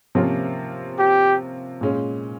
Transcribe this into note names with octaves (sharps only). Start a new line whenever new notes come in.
C3 F3 A#3 C#4 F4
G4
A#2 G#3 C#4